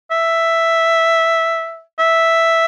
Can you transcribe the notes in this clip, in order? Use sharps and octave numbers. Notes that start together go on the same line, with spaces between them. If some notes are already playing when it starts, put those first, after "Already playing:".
E5
E5